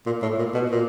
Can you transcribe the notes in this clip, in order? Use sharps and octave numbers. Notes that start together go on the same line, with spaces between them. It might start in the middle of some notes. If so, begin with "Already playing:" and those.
A#2
A2
A#2
B2
A#2